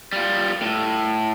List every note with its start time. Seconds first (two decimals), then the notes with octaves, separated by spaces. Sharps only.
0.13 G3 F4
0.62 A2